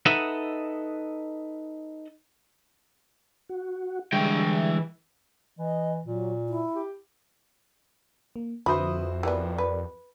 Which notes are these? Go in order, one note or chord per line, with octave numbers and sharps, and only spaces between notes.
D#4 A4 B4 D#5 E5 F#5
F#4
D3 E3 G3 G#3 G5
E3 D#5
A#2 F#3
E4
G4
A#3
F2 D3 E4 F#4 B4 C5 B5 D#6
E3 B3 G4 A#4 D5
B4